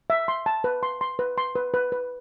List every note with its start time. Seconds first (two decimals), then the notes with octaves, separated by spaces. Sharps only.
0.10 E5
0.28 C6
0.46 A5
0.64 B4
0.83 C6
1.01 C6
1.19 B4
1.38 C6
1.56 B4
1.74 B4
1.92 B4